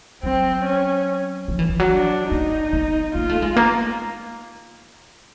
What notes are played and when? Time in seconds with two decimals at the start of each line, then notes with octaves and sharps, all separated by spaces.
0.23 F#3 C4
0.65 C#4
1.48 F3
1.59 E3
1.69 F3
1.80 F#3
1.90 D4
2.32 A#3 D#4
2.73 B3
3.15 A#3 F4
3.29 A3
3.42 G#3
3.56 A#3